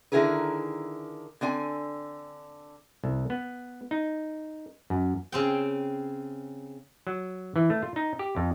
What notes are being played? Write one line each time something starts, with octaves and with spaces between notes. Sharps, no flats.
D3 D#3 E4 G#4 A#4 B4
D3 C4 D5 G#5
C2
B3
D#4
F#2
C#3 C4 G5
F#3
E3
A3
F4
D#4
G4
F2